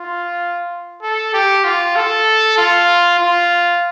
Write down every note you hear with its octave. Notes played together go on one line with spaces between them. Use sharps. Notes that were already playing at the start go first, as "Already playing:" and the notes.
Already playing: F4
A4
G4
F4
A4
F4
F4